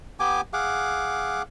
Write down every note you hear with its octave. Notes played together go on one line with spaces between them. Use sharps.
B3 G4 G#5 D6
G#4 F5 F#5 D6